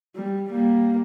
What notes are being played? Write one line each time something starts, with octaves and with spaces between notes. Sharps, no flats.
G3
G3 A#3